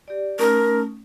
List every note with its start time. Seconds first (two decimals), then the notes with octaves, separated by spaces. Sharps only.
0.08 G4 D5
0.39 A3 C#4 D#4 A#4